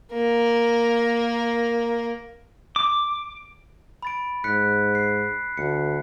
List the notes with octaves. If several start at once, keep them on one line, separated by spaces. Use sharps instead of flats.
A#3 A#4
D6
B5 A6 D7
G#2 F#6 B6 C#7
C7
D2 C#7